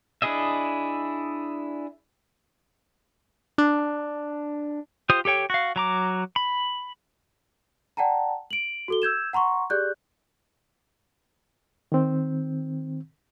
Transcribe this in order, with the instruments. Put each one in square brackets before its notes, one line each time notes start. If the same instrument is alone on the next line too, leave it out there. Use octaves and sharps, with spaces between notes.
[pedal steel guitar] D4 E4 G#4 D#5 E5
[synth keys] D4
[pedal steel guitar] F4 G4 C5 D#6
G4 A4 C#5 G5
F#4 F5
F#3 A#5 D6
B5
[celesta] D5 F#5 G5 A5 A#5
D7 F#7
F#4 A4 G7
E6 G6 G#6 E7
F#5 A#5 C6 C#6
G4 G#4 D5 F#6 G6
[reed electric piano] D#3 C4